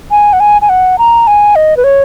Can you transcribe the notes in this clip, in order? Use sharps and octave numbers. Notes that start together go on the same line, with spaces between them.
G#5
F#5
G#5
G#5
F#5
A#5
G#5
D#5
B4
C#5